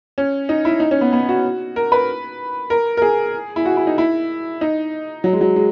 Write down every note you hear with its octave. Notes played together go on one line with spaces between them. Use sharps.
C#4
D#4
E4
D#4
C#4
B3
B3
F#4
A#4
B4
A#4
A#4
G#4
E4
F#4
E4
D#4
E4
D#4
F#3
G#3
F#3
G#3